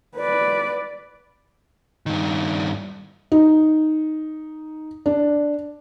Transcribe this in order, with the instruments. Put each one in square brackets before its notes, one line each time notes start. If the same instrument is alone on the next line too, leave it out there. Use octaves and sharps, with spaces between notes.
[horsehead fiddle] B4 D5
[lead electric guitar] G2 D#3
[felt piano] D#4
D4